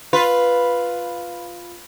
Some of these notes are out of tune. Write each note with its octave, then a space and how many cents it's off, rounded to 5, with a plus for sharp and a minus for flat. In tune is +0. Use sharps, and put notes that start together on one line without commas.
F4 +0 B4 +0